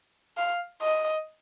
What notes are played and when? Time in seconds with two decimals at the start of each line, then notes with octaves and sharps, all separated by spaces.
0.38 F5
0.82 D#5